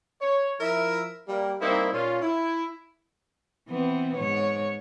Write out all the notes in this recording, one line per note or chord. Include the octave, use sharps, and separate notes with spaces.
C#5
F3 E4 A#4 E5
G3 A#3
G3 A#3 C4 D#4 E4
A#2 C#4 F4
E4
E3 B3 C4
G#2 C#5